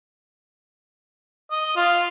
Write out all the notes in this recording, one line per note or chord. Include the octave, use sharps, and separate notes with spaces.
D#5
F4